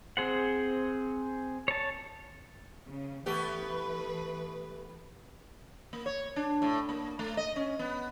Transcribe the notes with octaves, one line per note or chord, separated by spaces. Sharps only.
C4 G#4 C5 F#5
C#5 A5
C#3
E3 A3 B3 G4 B4
A#3
C#5
D4
A2
A#3
A3
D#5
C#4
B3